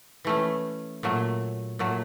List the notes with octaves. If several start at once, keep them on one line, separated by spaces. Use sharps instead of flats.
E3 A3 C#4
A#2 F#3 A3
A#2 F#3 A3